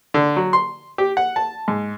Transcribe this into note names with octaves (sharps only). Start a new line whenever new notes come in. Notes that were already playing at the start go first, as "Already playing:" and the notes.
D3
F#3
C6
G4
F#5
A5
G#2